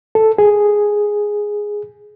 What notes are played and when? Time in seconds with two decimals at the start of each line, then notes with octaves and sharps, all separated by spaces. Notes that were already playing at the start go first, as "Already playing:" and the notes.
0.15 A4
0.38 G#4